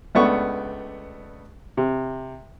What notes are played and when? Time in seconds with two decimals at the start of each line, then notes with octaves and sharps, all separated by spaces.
0.15 C#2 A3 B3 D4 C#6
1.77 C3